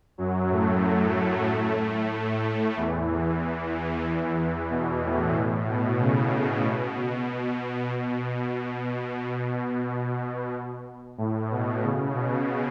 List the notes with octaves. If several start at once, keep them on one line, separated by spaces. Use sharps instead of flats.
F#2 F#3
A2 A3
F#2 F#3
A2 A3
A2 A3
E2 E3
B2
A2
A2
B2
C#3
C#3
B2
B2
A2
B2
C#3
B2